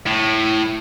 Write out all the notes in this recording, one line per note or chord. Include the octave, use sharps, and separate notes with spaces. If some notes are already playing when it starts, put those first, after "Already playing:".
A2